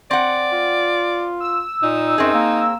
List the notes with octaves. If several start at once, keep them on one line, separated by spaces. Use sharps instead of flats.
C4 D5 F#5
F4
E6
A#2 D#4
F#2 C4 G#4
A#3